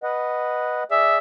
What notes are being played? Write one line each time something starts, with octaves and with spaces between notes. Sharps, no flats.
B4 D#5 F#5
G#4 D5 E5